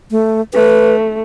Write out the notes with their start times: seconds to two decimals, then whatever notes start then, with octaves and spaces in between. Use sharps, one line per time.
0.11 A3
0.54 A3 B4